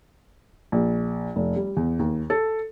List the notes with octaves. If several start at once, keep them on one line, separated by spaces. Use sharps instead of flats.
A#1
F1
G3
E2
D#2
A4